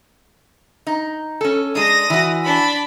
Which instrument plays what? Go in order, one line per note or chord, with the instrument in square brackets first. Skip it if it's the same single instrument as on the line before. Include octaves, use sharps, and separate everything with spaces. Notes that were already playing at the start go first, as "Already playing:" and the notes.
[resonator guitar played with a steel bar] D#4
C#4 A4
[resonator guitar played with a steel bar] G#3 D4 [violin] D#6 A#6
[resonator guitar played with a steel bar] E3 F#4
[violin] D4 B5